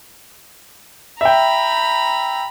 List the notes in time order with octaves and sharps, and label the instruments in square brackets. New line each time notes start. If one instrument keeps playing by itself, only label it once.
[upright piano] E5 G5 [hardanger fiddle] A#5 B5